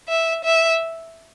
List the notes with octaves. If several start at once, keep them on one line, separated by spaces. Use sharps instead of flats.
E5
E5